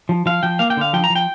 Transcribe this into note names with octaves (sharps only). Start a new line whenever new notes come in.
F3
F3 F5
F3 G5
A#3 F5
G5
D3 F5
F3 G5
A#5
F3
G5